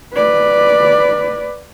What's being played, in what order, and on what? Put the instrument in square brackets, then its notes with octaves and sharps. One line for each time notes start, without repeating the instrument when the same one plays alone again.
[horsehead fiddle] B4 D5